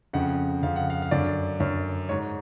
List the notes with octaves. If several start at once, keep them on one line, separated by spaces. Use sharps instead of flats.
F2 C#3 F#5
F2 C#3 F5
F#5
F5
F5
F#2 D3 D5
F#2 D3
G#2 C#5